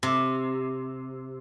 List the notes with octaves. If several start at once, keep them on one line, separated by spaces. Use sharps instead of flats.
C3